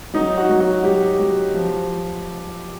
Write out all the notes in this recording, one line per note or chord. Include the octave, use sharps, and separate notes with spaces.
F#3 D#4
F#4
F#3
F#4
F#3 G4
F#3
F3